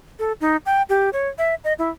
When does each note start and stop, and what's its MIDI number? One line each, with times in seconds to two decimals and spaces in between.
0.19 0.32 69
0.41 0.57 63
0.66 0.82 79
0.89 1.10 67
1.13 1.28 73
1.38 1.55 76
1.64 1.73 75
1.79 1.89 64